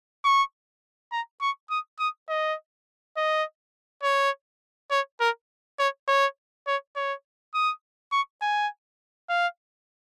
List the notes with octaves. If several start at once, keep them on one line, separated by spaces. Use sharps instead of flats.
C#6
A#5
C#6
D#6
D#6
D#5
D#5
C#5
C#5
A#4
C#5
C#5
C#5
C#5
D#6
C#6
G#5
F5